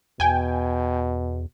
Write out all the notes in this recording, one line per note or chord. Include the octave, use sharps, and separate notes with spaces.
E2 B2 G5 G#5